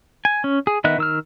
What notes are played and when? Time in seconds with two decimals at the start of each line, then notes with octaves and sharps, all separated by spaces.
0.25 G#5
0.44 C#4
0.67 G#4
0.84 D#3 B3 D#5 E5 F#6
0.98 D#3 E6 F6